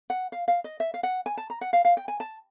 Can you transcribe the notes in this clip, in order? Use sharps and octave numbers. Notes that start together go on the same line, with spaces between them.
F#5
F5
F5
D#5
E5
F5
F#5
G#5
A5
A#5
F#5
F5
F5
G5
G#5
A5